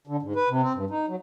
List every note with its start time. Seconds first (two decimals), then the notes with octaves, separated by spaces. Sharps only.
0.07 D3
0.22 G#2
0.36 B4
0.49 C3
0.61 C4
0.75 G2
0.90 D#4
1.08 F#3